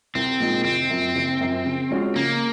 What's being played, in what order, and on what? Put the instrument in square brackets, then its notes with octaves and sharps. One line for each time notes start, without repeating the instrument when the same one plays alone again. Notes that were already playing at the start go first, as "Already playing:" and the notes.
[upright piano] C2 [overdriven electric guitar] C4
[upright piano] A#2 F3 G#3 D#4
[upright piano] F#1 [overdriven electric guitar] C4
[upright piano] F#2 F3
F#1
F#2 F3
C#3
F3 G#3 C#4 F#4
[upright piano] C#3 [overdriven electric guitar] A#3